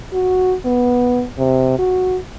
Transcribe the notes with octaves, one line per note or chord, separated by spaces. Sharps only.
F#4
B3
C3
F#4